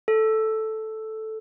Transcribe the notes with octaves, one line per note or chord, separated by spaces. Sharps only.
A4